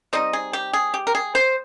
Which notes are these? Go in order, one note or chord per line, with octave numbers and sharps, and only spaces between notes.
G3 C4 D#4 D#5
G#4
G4
G#4
G4
A#4
G#4
C5